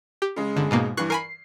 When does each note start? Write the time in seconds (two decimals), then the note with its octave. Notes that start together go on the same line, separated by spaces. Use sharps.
0.22 G4
0.36 C#3 G#3
0.56 G1 D3
0.71 G#2 B2 A#3
0.97 G2 E3 C#6 F#6 C7
1.10 A#4 G#5 B5 C7